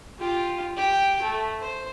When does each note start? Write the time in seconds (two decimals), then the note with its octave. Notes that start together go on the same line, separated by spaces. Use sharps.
0.19 F4 G4
0.77 G4 G5
1.22 A3
1.60 C5